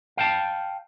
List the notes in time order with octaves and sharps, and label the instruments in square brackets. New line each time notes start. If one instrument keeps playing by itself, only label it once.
[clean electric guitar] F5 G5 A5